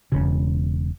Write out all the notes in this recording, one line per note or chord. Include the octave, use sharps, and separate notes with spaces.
E1 C#3